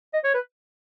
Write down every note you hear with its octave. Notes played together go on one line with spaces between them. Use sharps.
D#5
C#5
B4